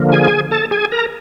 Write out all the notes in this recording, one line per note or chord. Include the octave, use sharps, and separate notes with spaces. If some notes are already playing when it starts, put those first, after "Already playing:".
Already playing: D3 F3 A#3
G#4 G#5
A4 A5
G#4 G#5
A#4 A#5